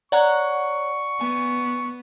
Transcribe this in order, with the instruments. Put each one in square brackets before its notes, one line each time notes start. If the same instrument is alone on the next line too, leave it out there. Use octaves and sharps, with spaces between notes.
[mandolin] C#5 A#5 F#6 [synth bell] D5 F#5 [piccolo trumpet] C#6
[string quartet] B3 [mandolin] G#5